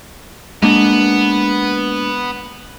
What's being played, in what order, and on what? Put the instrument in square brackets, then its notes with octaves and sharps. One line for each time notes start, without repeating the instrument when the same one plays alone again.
[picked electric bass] G#3 A#3 D4 [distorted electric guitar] B3